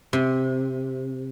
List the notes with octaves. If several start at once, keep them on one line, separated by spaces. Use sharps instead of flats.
C3